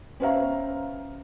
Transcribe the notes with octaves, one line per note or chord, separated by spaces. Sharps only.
C#4 B4 C5 E5 F5 A#5